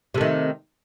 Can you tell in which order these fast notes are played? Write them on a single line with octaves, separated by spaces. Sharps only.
C3 A3 D#3